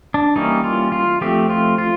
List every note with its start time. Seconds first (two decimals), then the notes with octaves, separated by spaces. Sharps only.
0.14 D4
0.36 E3 G3 A#3 C#4 D#4
0.64 F4
0.92 F4
1.21 F3 A3 C4 G4
1.50 F4
1.78 F4